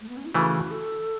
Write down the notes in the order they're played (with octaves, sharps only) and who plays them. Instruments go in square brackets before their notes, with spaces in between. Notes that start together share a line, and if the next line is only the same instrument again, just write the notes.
[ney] A3
B3
C#4
E4
[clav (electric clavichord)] C#3 E3 A3 [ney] F#4
[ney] A4